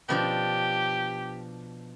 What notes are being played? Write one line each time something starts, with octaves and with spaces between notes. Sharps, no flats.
B2 F3 D4 G4